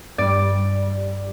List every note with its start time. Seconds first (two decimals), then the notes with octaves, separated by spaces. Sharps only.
0.18 G2 G3 D5